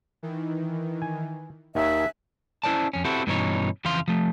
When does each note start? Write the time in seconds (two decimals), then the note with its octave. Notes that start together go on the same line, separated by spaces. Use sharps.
0.23 D#3 E3
1.02 G#5
1.75 D#2 D#3 E5 G#5 A5 F#6
2.64 C#4 E4 G4 C5 D5 A5
2.93 F2 C#4
3.05 C4 E4 F#4 G4 A4
3.27 G2 B2 E3 C#4 D#4 C#5
3.85 F2 C#3 E3 F3 F5 C6
4.08 F3 A3